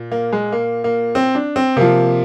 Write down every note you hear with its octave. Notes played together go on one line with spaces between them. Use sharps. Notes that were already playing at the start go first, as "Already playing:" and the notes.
Already playing: A#2
A#3
G#3
A#3
A#3
C4
D4
C4
C3 F3 A#3